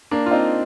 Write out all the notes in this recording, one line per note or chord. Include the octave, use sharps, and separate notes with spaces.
A#3 D4
F4
C4 D#4